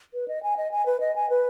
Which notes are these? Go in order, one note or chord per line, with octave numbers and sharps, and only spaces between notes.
B4
D#5
G#5
D#5
G#5
B4
D#5
G#5
B4